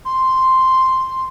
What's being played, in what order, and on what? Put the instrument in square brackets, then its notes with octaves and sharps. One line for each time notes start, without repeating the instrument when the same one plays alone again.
[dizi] C6